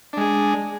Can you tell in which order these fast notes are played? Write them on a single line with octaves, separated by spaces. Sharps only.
D4 G#3 G#4